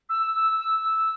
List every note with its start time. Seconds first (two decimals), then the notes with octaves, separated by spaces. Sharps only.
0.09 E6